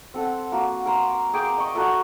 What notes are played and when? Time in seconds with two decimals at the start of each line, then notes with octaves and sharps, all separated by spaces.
0.14 C4 A4 F#5
0.52 A#3 F#4
0.86 A#4 A#5 C6
1.33 G#4 A#4 G5 D6
1.58 D#5 C#6
1.75 F#4 A4 A#4 E5